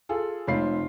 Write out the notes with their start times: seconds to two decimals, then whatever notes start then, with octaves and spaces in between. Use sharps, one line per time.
0.09 F4 G#4 A4
0.47 F1 C4 F4 C#5 B5 C7